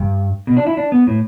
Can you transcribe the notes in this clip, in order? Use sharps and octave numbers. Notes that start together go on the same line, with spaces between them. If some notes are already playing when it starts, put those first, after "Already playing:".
Already playing: G2
B2
D4
E4
D4
B3
A2